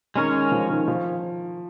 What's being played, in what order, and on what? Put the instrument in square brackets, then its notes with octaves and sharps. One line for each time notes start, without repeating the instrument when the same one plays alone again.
[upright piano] D#3 [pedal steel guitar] G#3 C#4 A#4 C#5
[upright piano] F3
D#3
F3